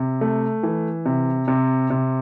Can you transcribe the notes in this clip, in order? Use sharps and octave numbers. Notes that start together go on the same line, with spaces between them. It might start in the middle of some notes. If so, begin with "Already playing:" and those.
Already playing: C3
A3
E3
C3
C3
C3